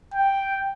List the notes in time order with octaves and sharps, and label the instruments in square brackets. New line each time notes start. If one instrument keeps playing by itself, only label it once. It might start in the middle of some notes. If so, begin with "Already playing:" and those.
[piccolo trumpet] G5